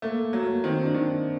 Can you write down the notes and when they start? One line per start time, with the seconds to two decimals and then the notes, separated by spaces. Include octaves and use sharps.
0.02 A3 A#3
0.22 A#3
0.33 F#3
0.43 A#3
0.64 D#3 C4
0.83 D4
0.94 D#3
1.05 D#4